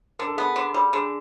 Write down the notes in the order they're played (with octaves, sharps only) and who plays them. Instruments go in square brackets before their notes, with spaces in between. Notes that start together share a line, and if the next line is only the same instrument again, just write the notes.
[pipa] D3 [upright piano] A#4
[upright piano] A4
G#4
[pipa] B3 [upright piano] A4
[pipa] D3
G3
[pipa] D3 [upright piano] G#4